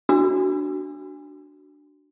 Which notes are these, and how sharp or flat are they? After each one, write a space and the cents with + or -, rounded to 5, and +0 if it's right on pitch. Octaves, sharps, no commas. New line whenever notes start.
D4 +0 F#4 +15 E6 +35